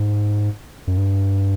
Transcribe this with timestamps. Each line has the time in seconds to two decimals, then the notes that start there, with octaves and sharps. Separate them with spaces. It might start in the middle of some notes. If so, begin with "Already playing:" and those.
Already playing: G#2
0.87 F#2
0.97 G2